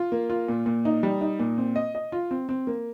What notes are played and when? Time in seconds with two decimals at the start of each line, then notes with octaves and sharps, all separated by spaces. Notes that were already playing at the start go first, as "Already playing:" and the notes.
Already playing: F4
0.12 A#3
0.30 F4
0.48 A#2
0.66 A#2
0.85 D#4
1.03 G3
1.21 D#4
1.40 A#2
1.58 C4
1.76 D#5
1.95 D#5
2.12 F4
2.31 C4
2.49 C4
2.67 A#3